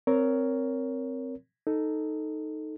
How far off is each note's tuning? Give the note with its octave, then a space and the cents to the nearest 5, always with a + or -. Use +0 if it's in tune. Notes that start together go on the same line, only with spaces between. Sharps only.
C4 +0 A#4 +0 C#5 +20
D#4 +0 A4 +0